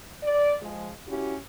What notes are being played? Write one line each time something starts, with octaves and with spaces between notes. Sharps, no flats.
D5
F3 G#3
C#4 E4 F#4 G4